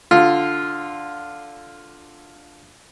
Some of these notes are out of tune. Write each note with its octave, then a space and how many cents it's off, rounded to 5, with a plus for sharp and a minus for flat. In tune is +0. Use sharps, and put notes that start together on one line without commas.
D3 +0 F4 +0